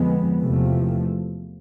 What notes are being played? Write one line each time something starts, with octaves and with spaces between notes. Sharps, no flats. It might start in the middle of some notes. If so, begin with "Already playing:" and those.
Already playing: F2 D3 F3 G#3 B3
E2 C3 F3 A3